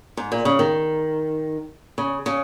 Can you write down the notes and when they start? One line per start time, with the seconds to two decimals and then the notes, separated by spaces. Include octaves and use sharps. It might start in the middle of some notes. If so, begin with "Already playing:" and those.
0.17 G#2
0.32 A#2
0.45 C#3
0.59 D#3
1.98 C#3
2.26 C#3